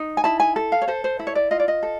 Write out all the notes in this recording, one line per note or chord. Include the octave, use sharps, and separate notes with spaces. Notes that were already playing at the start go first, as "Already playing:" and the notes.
Already playing: D#4
G#5
E4 A5
G#5
A4
F5
C#5
A4 C5
C5
E4
C#5
D5
F4 D#5
D5
D#5
A4